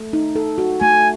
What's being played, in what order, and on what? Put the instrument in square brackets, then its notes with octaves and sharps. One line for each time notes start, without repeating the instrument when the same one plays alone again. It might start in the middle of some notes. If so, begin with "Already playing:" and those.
Already playing: [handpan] A3
D#4
A4
F#4
[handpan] A3 [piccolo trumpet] G#5